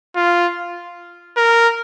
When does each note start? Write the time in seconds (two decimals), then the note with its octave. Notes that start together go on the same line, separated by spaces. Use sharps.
0.16 F4
1.37 A#4